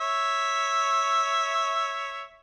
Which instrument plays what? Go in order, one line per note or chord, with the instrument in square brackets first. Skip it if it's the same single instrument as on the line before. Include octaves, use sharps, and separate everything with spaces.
[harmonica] C#5 E5